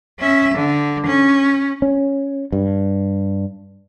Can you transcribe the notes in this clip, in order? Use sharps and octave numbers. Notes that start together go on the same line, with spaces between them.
C#4 E5
D3
C#4
C#4
G2